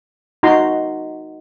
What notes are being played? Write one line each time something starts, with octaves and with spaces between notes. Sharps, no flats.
D#4 F#4 A#5 C6